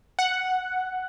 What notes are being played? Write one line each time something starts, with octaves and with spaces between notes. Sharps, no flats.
F#5